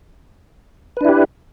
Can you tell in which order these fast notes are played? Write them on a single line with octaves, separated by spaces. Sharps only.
B4 D4 E4 G4